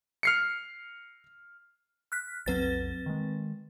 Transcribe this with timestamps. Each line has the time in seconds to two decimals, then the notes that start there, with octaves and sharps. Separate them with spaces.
0.23 F6 C7 C#7
2.12 F6 F#6 B6
2.46 B1 F2 F#3 C4 B4 A6
3.06 D#3 G#3